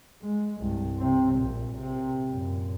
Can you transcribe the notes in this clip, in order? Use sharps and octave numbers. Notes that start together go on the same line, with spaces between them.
G#3
C2 G2
C3 C4
A#1 A#2
C3
F#2 A#2